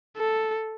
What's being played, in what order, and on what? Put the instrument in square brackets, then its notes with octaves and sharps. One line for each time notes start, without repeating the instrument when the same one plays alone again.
[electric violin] A4